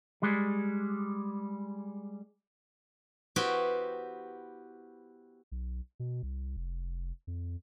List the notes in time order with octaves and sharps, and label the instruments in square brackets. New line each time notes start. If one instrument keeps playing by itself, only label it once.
[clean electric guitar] G3 G#3
[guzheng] B3 E4 F#4 G4 C5 G5
[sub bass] B1
B2
C2
F1
F2